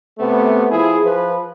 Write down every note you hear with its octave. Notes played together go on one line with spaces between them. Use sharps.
C3 A3 B3
F3 E4 G#4
F3 B4